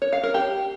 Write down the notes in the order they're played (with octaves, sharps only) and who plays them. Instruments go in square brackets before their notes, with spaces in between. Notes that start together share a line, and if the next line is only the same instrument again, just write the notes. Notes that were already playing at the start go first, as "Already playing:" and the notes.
[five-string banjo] C#5
F5
A#4
G4